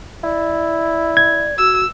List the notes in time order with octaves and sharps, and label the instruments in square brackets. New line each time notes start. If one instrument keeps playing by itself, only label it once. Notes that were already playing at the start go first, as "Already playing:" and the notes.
[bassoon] E4 [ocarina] D5
[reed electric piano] G#6
[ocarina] F#4 [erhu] E6